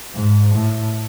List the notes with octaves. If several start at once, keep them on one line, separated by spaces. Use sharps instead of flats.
G#2
A2